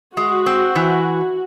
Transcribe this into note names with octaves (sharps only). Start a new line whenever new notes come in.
G#3 F#4
C4
E3